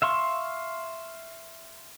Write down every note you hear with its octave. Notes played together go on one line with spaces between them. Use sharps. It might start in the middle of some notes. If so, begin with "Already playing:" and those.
E5 F5 C6 C#6